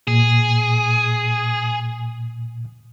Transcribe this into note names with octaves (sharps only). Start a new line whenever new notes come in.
A#2 G#4